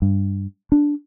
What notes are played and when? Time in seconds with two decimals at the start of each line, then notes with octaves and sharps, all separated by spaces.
0.02 G2
0.72 D4